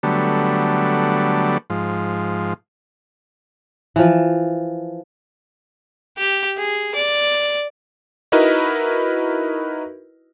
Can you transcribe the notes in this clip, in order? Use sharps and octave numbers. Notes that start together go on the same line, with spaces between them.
D3 F#3 G3 A3 B3
G#2 F3
E3 F3
G4
G#4
D5
D#4 E4 F#4 A#4 B4 D#5